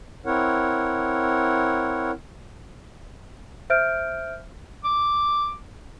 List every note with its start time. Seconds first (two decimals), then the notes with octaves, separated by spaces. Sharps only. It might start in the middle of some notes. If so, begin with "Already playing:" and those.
0.26 C4 E4 A#4 C#5 F#5
3.70 C5 E5 F6 G6 D7
4.84 D6